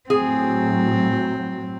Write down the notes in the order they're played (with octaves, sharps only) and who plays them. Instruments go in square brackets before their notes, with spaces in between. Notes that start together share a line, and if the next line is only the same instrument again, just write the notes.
[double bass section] A2 F#3 [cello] C4 [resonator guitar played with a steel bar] G#4